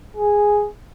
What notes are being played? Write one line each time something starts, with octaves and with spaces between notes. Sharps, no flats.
G#4